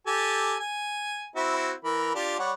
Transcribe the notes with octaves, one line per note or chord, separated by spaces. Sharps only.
G4 A4 G#5
G#5
C4 E4 F#4
E3 A#4 B5
D4 F4 G4
G3 C#5 F#5